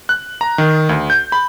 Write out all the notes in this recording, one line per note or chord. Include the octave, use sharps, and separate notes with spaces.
F#6
A#5
D#3
D2
G6
B5